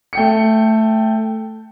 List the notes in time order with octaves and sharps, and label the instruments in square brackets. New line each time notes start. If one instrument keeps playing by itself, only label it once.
[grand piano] A3 G5 C#7